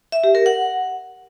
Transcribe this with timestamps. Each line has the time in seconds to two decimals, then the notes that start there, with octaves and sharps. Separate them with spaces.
0.12 E5
0.24 G4
0.35 A#4
0.46 F#5